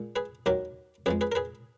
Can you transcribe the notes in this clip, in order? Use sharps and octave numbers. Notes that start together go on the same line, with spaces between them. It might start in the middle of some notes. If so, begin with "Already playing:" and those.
Already playing: A#2 G#3
G#4 B4
D#2 D#3 F#3 F#4 A#4
F2 F3 G#3 G#4 B4
G#4 B4
A#4
G#4 B4